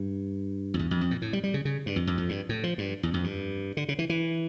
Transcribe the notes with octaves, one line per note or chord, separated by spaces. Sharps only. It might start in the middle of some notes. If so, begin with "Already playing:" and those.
Already playing: G2
F2
E2
F2
F2
A#2
A2
G3
G3
C#3
C#3
G2
F2
F2
F2
G2
A2
F3
G2
E2
F2
G2
D3
C#3
E3
E3